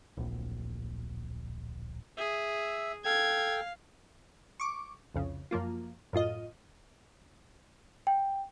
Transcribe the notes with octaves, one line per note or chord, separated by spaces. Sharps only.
D1 A#1
G#4 E5 E6
A4 F5 G5 G#6
C#6 D6
C2 F2 C#3
F#2 F3 A#3 F4
F#2 A2 F4 D#5
G5